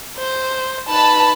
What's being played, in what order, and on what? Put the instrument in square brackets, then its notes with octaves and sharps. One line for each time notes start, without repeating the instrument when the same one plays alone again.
[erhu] C5
[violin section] D#4 B4 A5 [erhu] B5